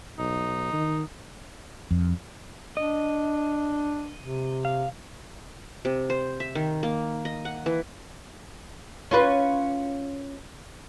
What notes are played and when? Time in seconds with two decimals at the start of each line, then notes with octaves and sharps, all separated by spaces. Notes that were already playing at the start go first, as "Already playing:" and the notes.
0.19 B1 D#4
0.73 D#3
1.91 F2
2.77 D4 D#5
4.20 C3
4.65 F5
5.85 C3
6.10 C5
6.40 E5
6.55 D#3
6.83 A#3
7.25 D#5
7.45 F#5
7.66 E3
9.11 C#4 F4 B4